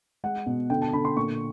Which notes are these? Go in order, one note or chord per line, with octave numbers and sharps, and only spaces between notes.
G#3 F#5
B2
D3 G5
A5
D3 B5
C6
A#2 C#6